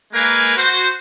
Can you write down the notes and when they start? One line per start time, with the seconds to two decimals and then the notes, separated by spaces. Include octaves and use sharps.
0.13 G#3 A#3 A#4 B4 F5 G#5
0.56 F#4 C5